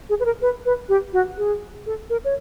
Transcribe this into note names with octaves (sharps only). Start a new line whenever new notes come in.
G#4
B4
A#4
B4
B4
G4
F#4
G#4
A4
A#4
C#5